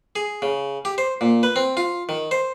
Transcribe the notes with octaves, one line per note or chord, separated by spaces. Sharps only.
G#4
C#3
G4
C5
A#2
B4
C4
F4
D#3
C5